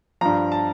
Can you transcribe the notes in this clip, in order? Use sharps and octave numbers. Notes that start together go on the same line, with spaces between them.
G2 F3 A#5
A5